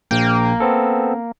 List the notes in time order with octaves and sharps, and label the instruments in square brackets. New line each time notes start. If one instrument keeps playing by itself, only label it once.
[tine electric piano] A#1 G5 [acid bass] A#3
[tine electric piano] B3 C4 A4